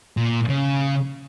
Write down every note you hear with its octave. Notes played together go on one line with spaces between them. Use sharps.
A#2
C#3